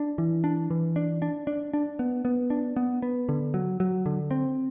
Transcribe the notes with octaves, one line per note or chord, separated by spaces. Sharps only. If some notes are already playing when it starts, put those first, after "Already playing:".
Already playing: D4
E3
D4
E3
D4
D4
D4
D4
B3
B3
D4
B3
B3
D3
F#3
F#3
D3
C4